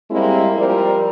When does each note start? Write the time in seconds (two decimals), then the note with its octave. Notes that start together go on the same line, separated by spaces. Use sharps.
0.10 G3 G#3 A#3 C4 E4
0.56 F3 G3 C4 A#4 D5